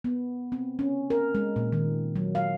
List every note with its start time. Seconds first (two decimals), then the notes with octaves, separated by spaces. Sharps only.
0.04 B3
0.52 C4
0.79 C#4
1.10 A#4
1.35 G#3
1.56 A#2
1.72 D#3
2.16 F#3
2.35 F5